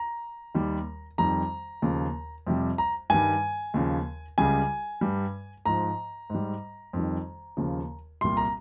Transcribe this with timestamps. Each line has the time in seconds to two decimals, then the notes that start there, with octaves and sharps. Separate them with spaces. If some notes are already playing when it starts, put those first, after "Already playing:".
Already playing: A#5
0.54 D#2 D#3 G3
1.18 F2 D#3 G3 A#5
1.82 D#2 C#3 F3
2.47 F2 C3 G3
2.78 A#5
3.10 G2 D#3 G3 G#5
3.74 D#2 C#3 F3
4.38 C#2 C#3 G3 G#5
5.01 G2 G3
5.66 G#2 F3 A#5
6.30 G#2 G3
6.93 F2 D#3 G3
7.57 D#2 C#3 F3
8.21 C2 A#2 G3 C6
8.37 A#5